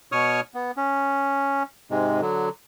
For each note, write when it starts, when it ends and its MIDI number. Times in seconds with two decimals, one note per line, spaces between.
0.12 0.41 47
0.12 0.41 73
0.12 0.41 85
0.12 0.41 87
0.12 0.41 89
0.54 0.71 59
0.77 1.63 61
1.91 2.21 44
1.91 2.21 48
1.91 2.21 56
2.21 2.49 50
2.21 2.49 54